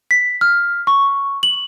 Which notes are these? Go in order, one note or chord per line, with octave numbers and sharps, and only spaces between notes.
B6
F6
C#6
F#7